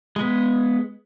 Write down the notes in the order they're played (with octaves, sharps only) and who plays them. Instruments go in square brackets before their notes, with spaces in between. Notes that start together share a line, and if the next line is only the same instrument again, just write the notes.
[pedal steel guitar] G#3 B3